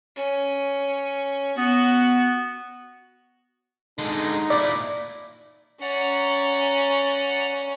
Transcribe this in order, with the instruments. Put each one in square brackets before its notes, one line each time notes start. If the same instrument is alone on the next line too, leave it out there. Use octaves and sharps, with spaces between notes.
[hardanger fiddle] C#4
[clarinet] B3 [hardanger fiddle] F#4
[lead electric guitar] D3 G#3 [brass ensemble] D#4
[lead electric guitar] A#2 E4 [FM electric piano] D5
[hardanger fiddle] C#4 [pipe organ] D5 F#5 A#5